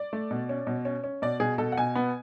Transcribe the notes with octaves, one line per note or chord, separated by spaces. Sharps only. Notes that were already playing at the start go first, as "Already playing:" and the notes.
Already playing: D5
A3
B2
C#4
B2
C#4
C#4
B2 D5
B2 G#4
B2 A4
F#5
B2 G#5
B3